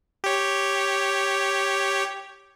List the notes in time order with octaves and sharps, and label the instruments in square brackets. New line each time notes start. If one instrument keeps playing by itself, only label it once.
[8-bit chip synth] G4 C#5